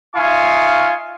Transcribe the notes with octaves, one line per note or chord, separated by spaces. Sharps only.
D#4 F4 E5 F5 G#5 C#6